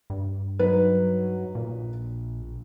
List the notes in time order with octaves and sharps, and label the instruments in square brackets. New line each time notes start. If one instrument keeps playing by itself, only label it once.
[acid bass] G2
[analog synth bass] F#3 [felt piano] D#4 B4
[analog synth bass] A#1 [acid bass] A#2